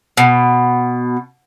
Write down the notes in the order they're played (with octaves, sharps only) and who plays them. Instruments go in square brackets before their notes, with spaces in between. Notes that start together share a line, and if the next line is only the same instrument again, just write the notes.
[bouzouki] B2